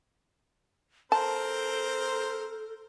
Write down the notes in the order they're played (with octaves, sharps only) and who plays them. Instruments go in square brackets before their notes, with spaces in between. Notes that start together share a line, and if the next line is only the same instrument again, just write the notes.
[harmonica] C4 A#4 C5 [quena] A4 [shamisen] A5